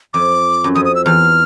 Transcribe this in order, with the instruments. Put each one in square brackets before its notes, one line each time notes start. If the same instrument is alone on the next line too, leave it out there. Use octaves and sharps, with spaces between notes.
[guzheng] F2 [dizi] D6
[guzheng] F#2
[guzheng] F2 [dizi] D#6
[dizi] D#6
E6
[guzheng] E2 [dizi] F6